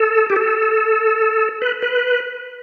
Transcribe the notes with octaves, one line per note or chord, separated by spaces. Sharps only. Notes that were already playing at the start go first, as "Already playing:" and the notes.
Already playing: A4
G4
A4
B4
B4